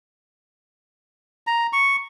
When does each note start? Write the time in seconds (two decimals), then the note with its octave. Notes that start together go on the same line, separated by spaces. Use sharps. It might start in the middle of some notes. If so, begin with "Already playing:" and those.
1.47 A#5
1.73 C#6